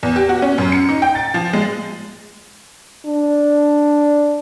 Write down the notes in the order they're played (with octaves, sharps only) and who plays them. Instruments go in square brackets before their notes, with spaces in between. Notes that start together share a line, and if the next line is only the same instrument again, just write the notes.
[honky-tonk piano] E2
G4
F#4
C#4
F#2
C#7
D#4
G5
A6
F3
G#3
[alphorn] D4